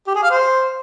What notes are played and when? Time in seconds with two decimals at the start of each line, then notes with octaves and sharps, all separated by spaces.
0.07 G4
0.15 G#4
0.23 F5
0.31 C5